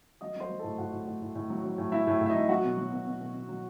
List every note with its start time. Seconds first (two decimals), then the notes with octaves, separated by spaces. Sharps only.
0.21 F#3 D#5 D#6
0.36 F#3 C5 C6
0.50 F#3
0.59 A2 A4 A5
0.78 A2 F#4 F#5
0.92 A2
1.07 A2
1.21 A2
1.35 A2
1.50 F#3
1.64 F#3
1.78 A2
1.92 F#3 E4 E5
2.07 A2
2.21 A2
2.26 E5
2.30 D#4 D#5
2.35 F#3
2.49 F#3 F#4 F#5
2.64 B2
2.77 F#3
2.92 B2
3.07 B2
3.21 B2
3.34 B2
3.49 F#3